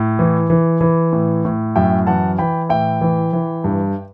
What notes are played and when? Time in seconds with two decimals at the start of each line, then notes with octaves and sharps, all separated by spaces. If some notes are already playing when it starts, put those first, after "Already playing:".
Already playing: A2
0.19 E3
0.50 E3
0.81 E3
1.13 A2
1.45 A2
1.76 F#2 E5 G5
2.07 E3 F#5 A5
2.39 E3 G5 B5
2.69 A2 E5 G5
3.01 E3
3.33 E3
3.64 G2